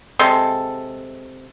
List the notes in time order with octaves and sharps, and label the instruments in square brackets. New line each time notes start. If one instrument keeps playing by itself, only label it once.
[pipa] C3 G#3 A4